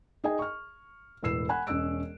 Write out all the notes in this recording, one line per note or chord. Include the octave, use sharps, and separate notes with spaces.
D#4 G#4 D#5 G5 G#5
C#6 F6
E1 A2 B4 E6 C7 E7
F#5 G#5 B5 F#6
E1 C#4 D#5 E6 D7